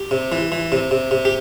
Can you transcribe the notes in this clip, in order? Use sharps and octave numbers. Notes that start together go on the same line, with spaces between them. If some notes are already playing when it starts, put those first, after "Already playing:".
Already playing: G4
C3
E3
E3
C3
C3
C3
G4